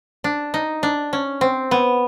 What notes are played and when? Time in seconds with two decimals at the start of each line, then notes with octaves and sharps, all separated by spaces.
0.24 D4
0.54 D#4
0.83 D4
1.13 C#4
1.41 C4
1.71 B3